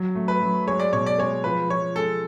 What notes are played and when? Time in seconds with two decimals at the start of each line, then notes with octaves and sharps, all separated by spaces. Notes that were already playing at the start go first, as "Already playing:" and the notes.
Already playing: F#3
0.15 A3
0.28 B4
0.41 F#3
0.67 G#3 C#5
0.80 D5
0.93 B2 C#5
1.06 D5
1.18 G#3 C#5
1.44 F3 B4
1.69 F3 C#5
1.95 G#3 A4